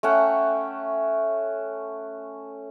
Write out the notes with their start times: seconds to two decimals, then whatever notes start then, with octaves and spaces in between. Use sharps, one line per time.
0.03 A3 C#4 F#5 G5